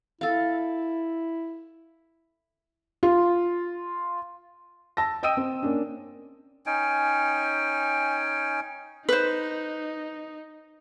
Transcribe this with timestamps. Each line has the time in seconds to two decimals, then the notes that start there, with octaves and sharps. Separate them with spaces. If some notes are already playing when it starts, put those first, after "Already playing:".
0.21 E4 A4 F5
3.03 F4
4.97 A5 E6 A#6
5.23 D#5 G5 D#6 E6 D#7
5.37 C4
5.63 A#3 C#4 D4
6.66 C#4 D#4 G5 G#5
9.09 D#4 B4 C5